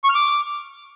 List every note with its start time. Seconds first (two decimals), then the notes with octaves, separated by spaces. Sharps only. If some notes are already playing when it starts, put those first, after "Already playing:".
0.04 C#6
0.09 F6
0.15 D6